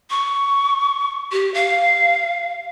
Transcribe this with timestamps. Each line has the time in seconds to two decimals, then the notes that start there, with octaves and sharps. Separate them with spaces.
0.10 C#6
1.32 G4
1.54 F5